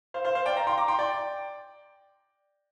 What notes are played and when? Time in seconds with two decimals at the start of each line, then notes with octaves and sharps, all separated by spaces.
0.14 C5 F5
0.24 C5 F5
0.35 C5 F5
0.46 D5 G5
0.57 F5 A#5
0.67 G5 C6
0.77 A#5 D6
0.88 G5 C6
0.99 D5 G5